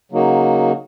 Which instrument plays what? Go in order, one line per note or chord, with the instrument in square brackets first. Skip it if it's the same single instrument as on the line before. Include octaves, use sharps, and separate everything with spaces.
[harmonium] C#3 F#3 A#3 D#4 F#4